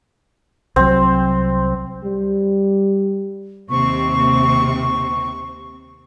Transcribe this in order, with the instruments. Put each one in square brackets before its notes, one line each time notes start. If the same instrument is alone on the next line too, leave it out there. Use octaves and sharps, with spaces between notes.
[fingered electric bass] C2 F#3 [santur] C4
[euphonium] G3
[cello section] D#2 C3 C4 [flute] C#6